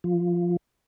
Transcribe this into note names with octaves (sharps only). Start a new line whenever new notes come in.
F3